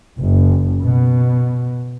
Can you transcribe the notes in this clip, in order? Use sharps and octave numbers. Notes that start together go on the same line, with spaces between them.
F#1
B2